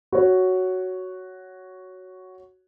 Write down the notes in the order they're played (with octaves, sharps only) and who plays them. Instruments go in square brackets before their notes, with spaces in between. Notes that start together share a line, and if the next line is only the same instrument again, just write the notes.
[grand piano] F#4 C#5